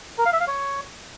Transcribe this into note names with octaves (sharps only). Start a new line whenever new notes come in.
A#4
F5
E5
F5
C#5